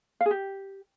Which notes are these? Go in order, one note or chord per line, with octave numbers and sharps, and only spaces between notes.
F5
G#4
G4